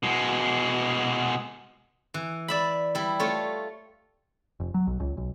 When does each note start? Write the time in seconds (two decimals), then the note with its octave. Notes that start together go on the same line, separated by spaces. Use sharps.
0.03 B2 G#3
2.14 E3
2.48 D5 E5 B5
2.95 G3 E4
3.20 A3 F4 C#5
4.60 F1
4.74 F#3
4.87 B1
5.00 C#2
5.17 B1